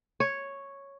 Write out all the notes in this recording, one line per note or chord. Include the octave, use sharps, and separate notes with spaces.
C#5